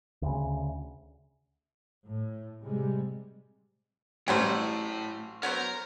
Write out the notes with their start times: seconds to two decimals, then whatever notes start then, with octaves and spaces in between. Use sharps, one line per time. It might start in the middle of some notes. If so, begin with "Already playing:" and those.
0.22 D2 C#3
2.06 A2
2.63 C3 G3 G#3
4.28 A1 A2 F#3 G3 D#4 C5 G5
5.43 F#3 B3 A#4 C5 A#5